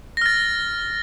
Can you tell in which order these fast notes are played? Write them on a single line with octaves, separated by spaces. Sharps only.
A#6 F6 A6